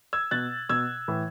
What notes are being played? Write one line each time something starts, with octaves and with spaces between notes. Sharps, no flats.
E6 G#6
B2 F#6 A6
B2 E6 G#6
A2 E3